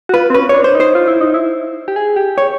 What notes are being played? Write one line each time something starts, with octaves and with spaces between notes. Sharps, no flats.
F#4
F4 B4
C4
C#4 B4
D4 C#5
C5
D#4
C5
F4
E4
D#4
E4
G4
G#4
G4
C#5